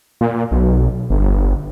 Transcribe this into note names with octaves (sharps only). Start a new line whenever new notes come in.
A#2
B1
G1